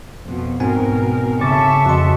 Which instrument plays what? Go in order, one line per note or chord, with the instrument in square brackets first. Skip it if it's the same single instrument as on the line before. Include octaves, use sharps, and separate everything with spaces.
[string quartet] F2 B2
[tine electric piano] G#2 C4 G#5 [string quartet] B2 A#4
[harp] C#3 D6 A6 [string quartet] A4 E5 C#6
[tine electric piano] F2 C6 [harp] F#4 D#5